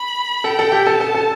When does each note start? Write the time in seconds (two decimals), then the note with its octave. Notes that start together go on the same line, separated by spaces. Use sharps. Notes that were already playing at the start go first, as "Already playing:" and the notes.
Already playing: B5
0.44 A4 G5
0.59 A4
0.72 G4
0.86 A4 A5
1.01 A4
1.15 A4